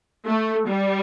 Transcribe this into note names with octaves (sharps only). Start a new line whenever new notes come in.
A3
G3